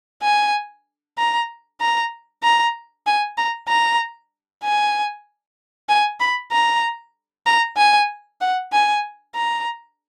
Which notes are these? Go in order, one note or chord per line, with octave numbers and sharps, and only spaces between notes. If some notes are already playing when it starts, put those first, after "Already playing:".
G#5
A#5
A#5
A#5
G#5
A#5
A#5
G#5
G#5
B5
A#5
A#5
G#5
F#5
G#5
A#5